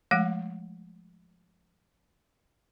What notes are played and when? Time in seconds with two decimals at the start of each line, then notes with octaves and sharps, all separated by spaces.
0.11 F3 G#3 A3 F#5